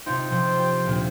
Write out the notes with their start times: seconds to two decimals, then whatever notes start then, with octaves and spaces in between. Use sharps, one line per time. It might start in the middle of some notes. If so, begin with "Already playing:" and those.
0.06 C3 D#4 F4 C5 G5
0.30 C3 F3
0.60 G4
0.86 D2 A#2